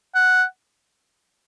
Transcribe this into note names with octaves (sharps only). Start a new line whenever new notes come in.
F#5